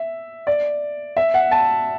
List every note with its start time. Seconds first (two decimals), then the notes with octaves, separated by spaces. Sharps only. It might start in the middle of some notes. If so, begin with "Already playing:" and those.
Already playing: E5
0.47 D5
1.17 E5
1.34 F#5
1.51 A5